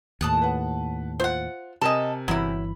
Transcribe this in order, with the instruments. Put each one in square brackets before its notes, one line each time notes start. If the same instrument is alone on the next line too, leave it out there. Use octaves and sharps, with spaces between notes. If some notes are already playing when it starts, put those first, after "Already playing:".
[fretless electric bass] D#2 A2 [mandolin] A5 D#6 F#6
[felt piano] B4 F#5
[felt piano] F4 [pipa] C5 F#5
[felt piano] C3 A#4 G#5 [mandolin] A4 [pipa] D#5 A5
[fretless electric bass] G1 E3 [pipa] F#3 E4 [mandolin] B5